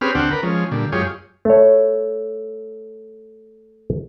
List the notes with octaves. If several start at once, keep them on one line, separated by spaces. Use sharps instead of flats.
C4 C#4 G4 G#4 B4 F6
D2 C4 D4 F#5 G5
A#4 B4
F3 G#3 C#4
A#2 D3 G3
F#2 G#3 F4 G4 G#4 C#5
A3 C#5